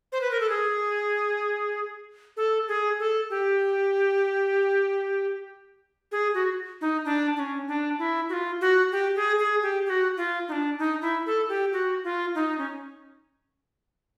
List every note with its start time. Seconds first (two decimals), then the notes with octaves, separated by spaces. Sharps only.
0.12 C5
0.21 B4
0.31 A#4
0.40 A4
0.49 G#4
2.37 A4
2.68 G#4
2.99 A4
3.30 G4
6.12 G#4
6.34 F#4
6.81 D#4
7.05 D4
7.36 D4
7.39 C#4
7.68 D4
7.99 E4
8.29 F#4
8.33 F4
8.61 F#4
8.92 G4
9.16 G#4
9.39 G#4
9.63 G4
9.86 G4
9.90 F#4
10.17 F4
10.48 D#4
10.52 D4
10.79 D#4
11.02 E4
11.26 A4
11.49 G4
11.73 F#4
12.04 F4
12.35 D#4
12.58 C#4